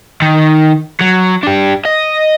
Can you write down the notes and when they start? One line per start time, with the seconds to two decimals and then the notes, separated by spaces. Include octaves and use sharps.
0.22 D#3
1.00 F#3
1.43 D4 G4
1.85 D#5